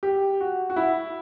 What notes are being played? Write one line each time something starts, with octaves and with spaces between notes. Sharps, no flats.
G4
F#4
F#4
E4